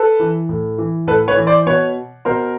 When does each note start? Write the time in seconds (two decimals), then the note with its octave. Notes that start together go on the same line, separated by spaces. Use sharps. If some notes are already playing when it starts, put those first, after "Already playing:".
Already playing: A4 B4
0.20 E3
0.49 A2
0.78 E3
1.07 A2 A4 B4
1.28 B4 C#5
1.36 E3
1.47 C5 D5
1.66 B2 B4 C#5
2.25 B2 A#4 C5